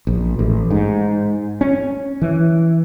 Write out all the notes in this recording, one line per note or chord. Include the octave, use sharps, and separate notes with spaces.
A#1
A1
G#2
C#4
E3